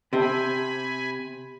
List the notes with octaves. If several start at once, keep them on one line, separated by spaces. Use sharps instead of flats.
C3 G4 C5 E5 G#5 B5